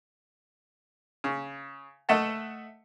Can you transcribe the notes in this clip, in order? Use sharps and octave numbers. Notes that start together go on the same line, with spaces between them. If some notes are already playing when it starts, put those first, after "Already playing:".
C#3
A3 A4 D#5 E5 F#5 A5